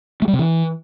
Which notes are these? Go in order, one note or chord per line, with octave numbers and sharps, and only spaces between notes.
A3
G3
C3
E3